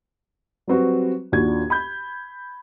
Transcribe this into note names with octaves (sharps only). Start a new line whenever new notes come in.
F#3 G3 C4 F#4 B4
D#2 A#2 D4 F#4 G#6
B5 G6